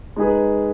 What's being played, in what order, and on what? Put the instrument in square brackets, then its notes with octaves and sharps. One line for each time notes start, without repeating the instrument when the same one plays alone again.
[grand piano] G#3 D#4 G#4 B4